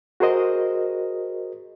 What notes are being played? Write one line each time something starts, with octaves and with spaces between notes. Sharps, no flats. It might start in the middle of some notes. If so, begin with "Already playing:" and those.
F#4 G#4 A#4 C5 D#5